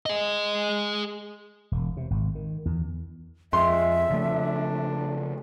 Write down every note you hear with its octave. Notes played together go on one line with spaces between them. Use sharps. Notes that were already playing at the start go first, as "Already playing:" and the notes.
G#4 D#5
E1
C3
G#1
D#3
E2
F2 G#3 E5 C6
C#3 F3 A3 D4